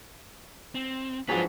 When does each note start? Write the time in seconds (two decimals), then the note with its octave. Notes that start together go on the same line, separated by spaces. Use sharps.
0.75 C4
1.29 G#2 F3 F#3 D4 F4 G#4 B4